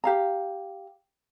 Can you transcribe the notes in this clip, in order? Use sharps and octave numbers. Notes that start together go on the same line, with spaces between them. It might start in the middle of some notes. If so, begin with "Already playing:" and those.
G4 F5 A#5